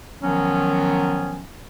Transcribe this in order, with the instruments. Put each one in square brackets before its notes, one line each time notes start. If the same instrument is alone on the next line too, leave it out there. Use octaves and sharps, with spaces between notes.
[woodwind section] D#3 F3 F#3 B3 C#4